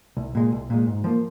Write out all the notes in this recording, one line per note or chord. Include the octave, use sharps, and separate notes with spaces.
C2
A#2 G#3
C2
A#2 G#3
G#2
F3 A#3